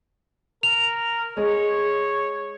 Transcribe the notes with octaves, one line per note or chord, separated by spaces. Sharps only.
A#4 F7
G#3 C#5